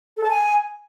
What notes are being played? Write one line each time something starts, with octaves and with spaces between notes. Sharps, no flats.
A4
A5
G#5